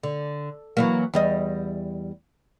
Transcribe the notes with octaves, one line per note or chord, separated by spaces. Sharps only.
D3
E3 F#3 A#3
E2 G3 D#5